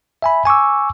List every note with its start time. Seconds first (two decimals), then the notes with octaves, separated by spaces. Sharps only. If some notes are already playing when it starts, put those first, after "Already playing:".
0.22 E5 G#5 B5
0.45 G#5 C#6 D6 E6